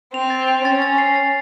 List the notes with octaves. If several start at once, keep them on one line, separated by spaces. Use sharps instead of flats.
C4 F7
A6
F7
C#4 A6
A6
C7
A6